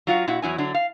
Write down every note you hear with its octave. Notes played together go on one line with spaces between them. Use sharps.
F#3 F4 F#4
A#2 E4 F#4
E2 F#3 E4 G#5
D3 F#3 D4
F5